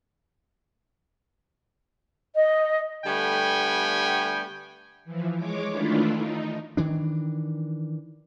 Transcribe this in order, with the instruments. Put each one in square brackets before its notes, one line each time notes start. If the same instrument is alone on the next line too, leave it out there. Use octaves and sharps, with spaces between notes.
[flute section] D#5
[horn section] D3 G3 A3 B3 G5 G#5
[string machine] E3 F3
G#3 C#5 D6
D#3 E3 A3 D4 E4 F4
D#4
[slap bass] D#3 E3 D4